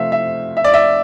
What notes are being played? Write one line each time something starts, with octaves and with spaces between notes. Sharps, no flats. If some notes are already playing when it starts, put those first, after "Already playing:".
Already playing: C3 F3 A3 E5 F5
E5
E5
D5
E5